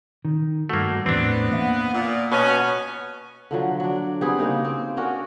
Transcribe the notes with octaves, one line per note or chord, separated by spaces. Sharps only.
D#3
G2 A3 A#3 F#4
E2 A2 B3 C4 D4
A#3 E5 F#5
A#2
B2 B3 C#4 F#4
D3 F3 F#3
F#3 D4
G3 B3 C4 G#4
C#3 A#3 D#4
C4
C#4 D4 F#4 A#4